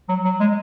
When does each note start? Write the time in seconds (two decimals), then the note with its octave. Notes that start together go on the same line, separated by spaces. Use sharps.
0.09 F#3
0.25 F#3
0.40 G#3